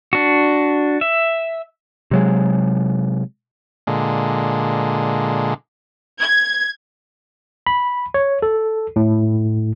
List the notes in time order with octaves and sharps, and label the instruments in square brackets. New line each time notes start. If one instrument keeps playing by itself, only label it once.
[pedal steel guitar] D4 F#4
E5
[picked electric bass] C3 F#3 G#3
[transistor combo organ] A#2 D3 G#3
[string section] G#6
[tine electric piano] B5
C#5
A4
A2